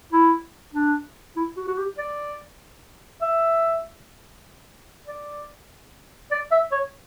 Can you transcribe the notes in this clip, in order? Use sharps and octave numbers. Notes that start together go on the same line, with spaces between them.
E4
D4
E4
F#4
F#4
G4
D5
E5
D5
D5
E5
C#5